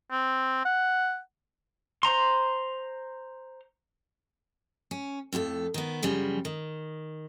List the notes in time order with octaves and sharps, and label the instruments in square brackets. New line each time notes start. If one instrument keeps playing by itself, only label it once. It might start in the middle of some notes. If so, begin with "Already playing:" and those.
[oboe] C4
F#5
[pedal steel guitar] C5 A#5 C6
[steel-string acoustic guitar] C#4
F2 A2 F4 A4
D#3 B3
F#2 C#3 F3 G3
D#3